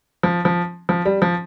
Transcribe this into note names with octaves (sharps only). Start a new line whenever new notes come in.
F3
F3
F3
G3
F3